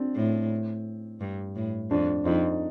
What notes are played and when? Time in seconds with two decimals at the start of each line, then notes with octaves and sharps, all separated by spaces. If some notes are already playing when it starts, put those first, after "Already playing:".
Already playing: C4 D4
0.16 A2
1.21 G2
1.56 A2
1.91 F2 D4
2.25 F2 D#4